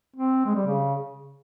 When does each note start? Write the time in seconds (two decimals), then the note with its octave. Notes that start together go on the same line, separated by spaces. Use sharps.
0.16 C4
0.46 G#3
0.55 G3
0.67 C#3